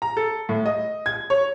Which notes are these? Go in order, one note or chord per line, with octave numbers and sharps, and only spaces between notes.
A#5
A4
A2
D#5
G#6
C#5